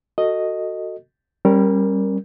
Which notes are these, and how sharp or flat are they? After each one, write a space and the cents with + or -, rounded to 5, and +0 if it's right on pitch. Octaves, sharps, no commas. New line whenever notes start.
F#4 +0 A4 +25 D#5 +0
G3 +0 C#4 -35 A#4 +0